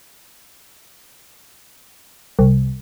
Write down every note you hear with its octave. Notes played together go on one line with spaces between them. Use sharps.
C2